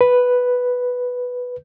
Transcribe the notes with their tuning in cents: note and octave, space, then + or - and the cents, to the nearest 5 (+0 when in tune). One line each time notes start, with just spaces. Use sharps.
B4 +0